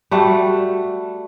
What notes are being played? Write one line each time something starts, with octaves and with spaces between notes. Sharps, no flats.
G3 A3 F#4